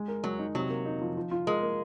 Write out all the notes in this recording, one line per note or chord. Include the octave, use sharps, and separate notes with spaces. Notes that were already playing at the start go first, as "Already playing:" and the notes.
Already playing: G#3
A#4
F#3 G#3
D#4
C3 F#3
A#3
D#4
F3
F3
F4
G#3 A#4
A#3